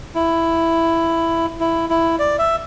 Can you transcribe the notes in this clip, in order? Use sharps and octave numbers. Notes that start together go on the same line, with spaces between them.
E4
E4
E4
D5
E5